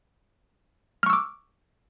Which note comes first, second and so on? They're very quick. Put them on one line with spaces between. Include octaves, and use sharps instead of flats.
F6 C#6 E6 D6